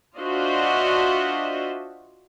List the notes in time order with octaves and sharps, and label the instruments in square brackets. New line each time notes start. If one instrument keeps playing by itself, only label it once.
[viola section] D4 F4 F#4 C5 D#5 E5